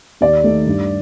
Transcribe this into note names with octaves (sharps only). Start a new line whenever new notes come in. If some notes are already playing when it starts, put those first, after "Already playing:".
D#2 D5
D#3 A3 D#4
G2